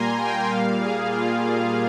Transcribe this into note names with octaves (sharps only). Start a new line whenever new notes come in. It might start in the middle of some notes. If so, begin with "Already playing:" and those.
Already playing: A#2 G3 A#3 G#5 A#5 C6
G5
A#2 G3 A#3 F5
G#4
F4